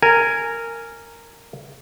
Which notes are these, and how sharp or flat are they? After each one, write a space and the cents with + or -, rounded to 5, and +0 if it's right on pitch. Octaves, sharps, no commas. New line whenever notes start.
A#4 -15 G#5 +0